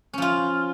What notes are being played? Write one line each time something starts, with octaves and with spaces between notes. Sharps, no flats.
F3 C#4 F4